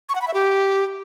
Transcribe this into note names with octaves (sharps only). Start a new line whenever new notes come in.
C#6
F#5
B5
E5
G4